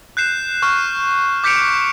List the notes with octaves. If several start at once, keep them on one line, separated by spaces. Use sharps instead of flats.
F#6 G6 C7 E7
C#6 F6 E7
D6 G6 B6 C#7 D7 F7